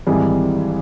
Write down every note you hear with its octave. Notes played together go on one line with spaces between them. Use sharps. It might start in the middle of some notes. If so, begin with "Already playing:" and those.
G#1 G#2 E3 G3 G#4